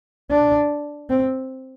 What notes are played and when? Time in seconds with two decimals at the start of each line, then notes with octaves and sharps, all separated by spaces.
0.30 D4
1.09 C4